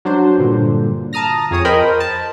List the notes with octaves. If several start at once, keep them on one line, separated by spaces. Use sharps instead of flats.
F#3 D4 C5
G2 A#2 D3
A5 A#5 D#6 F6 A#6
F2 G#4 C#5 D#6
A#4 C5 D#5 G5 B5
A5